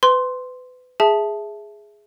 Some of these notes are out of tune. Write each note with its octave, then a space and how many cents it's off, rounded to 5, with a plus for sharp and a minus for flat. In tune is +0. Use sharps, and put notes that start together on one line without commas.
B4 +30 C6 +0
G#4 +0 E5 +0 A5 -10